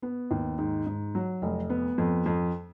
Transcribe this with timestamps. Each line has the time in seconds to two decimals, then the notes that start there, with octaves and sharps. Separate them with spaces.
0.02 B3
0.31 D#2
0.58 G#2
0.87 G#2
1.15 F#3
1.42 F1
1.70 B3
1.98 F2
2.26 F2